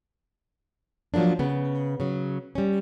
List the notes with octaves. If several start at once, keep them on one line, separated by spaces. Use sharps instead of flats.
F3 F#3 G#3 A#3 D4
C#3 B3
C#3 F#3
G3 C#4